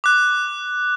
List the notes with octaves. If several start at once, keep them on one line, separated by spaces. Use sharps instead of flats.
D6 F#6